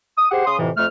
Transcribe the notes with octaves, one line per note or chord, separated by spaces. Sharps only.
D#6
G4 G#4 C5 F#5
C#3 C6 D#6
F2 A2 C3 E3
F2 A3 F6